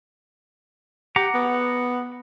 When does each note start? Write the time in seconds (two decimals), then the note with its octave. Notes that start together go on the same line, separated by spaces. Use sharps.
1.16 G4 F#5 A#5 D6
1.34 B3